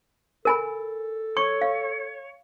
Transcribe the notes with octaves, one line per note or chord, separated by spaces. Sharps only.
A4 A#4 G#5 B5
C#5 C#6
F5